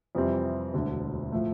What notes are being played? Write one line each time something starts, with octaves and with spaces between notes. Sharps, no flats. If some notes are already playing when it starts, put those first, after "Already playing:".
F2 C3 E3 G3 C4
E1 D2 D3
A2 F3 A3